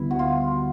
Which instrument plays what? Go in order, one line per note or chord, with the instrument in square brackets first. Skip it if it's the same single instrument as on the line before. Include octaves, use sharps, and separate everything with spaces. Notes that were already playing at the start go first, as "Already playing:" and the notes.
Already playing: [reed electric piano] D2 D3 G3 B3 [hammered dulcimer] E4
[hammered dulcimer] F#4
F4